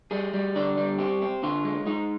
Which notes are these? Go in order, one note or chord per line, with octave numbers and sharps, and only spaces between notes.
G3 G#4
G3
D3 D5
G3
C4 G4
C4
D3 F4
G#3
G#3 D#4